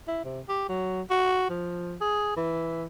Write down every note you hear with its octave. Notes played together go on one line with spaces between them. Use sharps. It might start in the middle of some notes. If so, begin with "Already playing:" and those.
E4
C3
G4
F#3
F#4
F3
G#4
E3